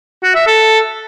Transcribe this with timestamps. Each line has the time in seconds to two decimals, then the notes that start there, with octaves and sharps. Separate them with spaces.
0.23 F#4
0.35 E5
0.47 A4